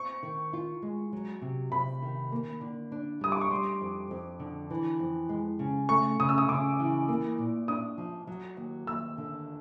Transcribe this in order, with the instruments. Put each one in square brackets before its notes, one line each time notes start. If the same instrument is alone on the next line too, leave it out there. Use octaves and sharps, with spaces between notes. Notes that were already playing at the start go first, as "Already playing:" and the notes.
Already playing: [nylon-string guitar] C4 [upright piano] C#6
[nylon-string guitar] D#3
F4
G#3
F#3
C3
[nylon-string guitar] C3 [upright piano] B5
[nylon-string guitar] D#3
A#3
D3
D4
[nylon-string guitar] G3 [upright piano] D#6
[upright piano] D6
C#6
[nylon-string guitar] G3 [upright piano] C6
[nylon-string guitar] F2
F2
D3
E3
F2
G#3
C#3
[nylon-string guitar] A3 [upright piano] C#6
[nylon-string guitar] C#3 [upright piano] D#6
[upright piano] E6
D#6
[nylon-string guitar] C#3 [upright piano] D6
[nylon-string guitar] E3
A#3
A#2
[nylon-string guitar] D4 [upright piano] D#6
[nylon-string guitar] F3
F#3
D#2
[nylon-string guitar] D#2 [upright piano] E6
[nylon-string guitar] D3